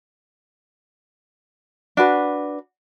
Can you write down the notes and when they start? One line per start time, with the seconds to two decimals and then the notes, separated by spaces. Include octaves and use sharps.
1.97 D4 F#4 B4